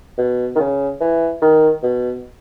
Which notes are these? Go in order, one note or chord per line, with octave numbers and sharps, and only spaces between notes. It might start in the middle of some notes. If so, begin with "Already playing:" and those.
B2
D#3
C#3
E3
D#3
B2